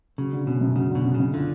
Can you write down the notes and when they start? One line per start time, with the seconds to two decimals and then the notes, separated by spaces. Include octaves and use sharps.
0.18 C#3 F#3
0.33 D3
0.46 B2 C#4
0.61 F#2
0.76 C#3 F#3
0.90 D3
0.95 B2
1.04 C#4
1.14 F#2 C#3
1.34 D3 F4